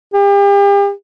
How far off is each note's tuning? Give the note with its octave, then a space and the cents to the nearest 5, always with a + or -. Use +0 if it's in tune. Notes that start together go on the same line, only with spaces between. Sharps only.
G4 +40